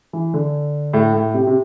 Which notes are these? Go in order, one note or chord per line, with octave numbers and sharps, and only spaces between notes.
E3
D3
A2
A2
C3
C3